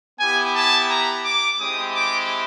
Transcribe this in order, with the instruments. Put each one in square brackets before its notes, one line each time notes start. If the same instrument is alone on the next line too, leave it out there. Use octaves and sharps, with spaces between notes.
[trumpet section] B3 E4 G4 G#5
A5
A#5
D6
G#3 C4 E4 G4 D#6
D6